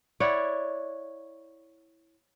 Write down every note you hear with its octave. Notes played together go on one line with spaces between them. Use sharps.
E4 C#5 D5 F#5